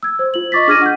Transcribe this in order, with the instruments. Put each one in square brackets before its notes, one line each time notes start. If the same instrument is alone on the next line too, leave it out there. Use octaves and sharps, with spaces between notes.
[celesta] E6 G#6
C5
F4 F#7
D#5 C#6 D6 A6 B6
D4 G#4 F6 G#6 A#6 D#7
F#5 G6